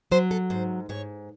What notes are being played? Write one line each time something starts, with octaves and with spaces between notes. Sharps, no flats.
F#3 C5
A4
G#2 C5
G#2 C#5